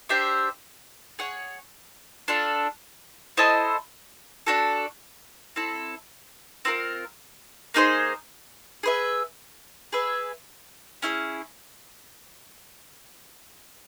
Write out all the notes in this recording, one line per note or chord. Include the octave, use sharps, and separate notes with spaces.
D4 G4 C5 E5
G#4 C#5 F#5
D4 F4 A4
E4 A4 C5 D#5
D4 F#4 A4
C4 E4 A4
C4 F4 A#4
A#3 D#4 G#4 C5
G#4 B4 E5
G#4 B4 E5
C#4 E4 G#4